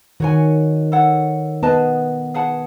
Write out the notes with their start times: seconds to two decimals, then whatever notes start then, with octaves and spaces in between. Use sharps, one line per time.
0.20 D#3 F#4 C#5 G#5
0.92 A4 C#5 F#5
1.62 B3 G#4 B4 D#5 A5
2.34 G#4 B4 F#5 A5